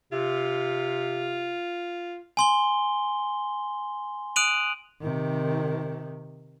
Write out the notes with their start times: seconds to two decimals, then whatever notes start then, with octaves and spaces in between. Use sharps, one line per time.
0.12 C3 F4
2.37 G#5 C6 G7
4.36 D#6 F#6 D7 D#7 F7 F#7
5.01 C3 D#3